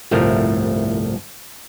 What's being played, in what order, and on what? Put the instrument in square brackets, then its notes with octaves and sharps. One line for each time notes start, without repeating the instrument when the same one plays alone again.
[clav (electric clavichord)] G1 C2 A2 F3 A3 A#4